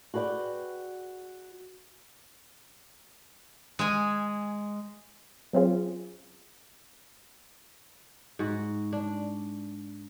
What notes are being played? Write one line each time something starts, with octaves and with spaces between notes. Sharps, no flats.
F#4 G#4 B4 D5 G5
G#3 G#5
F#3 C4 C#4 F4 G#4
G#2 F#4
D4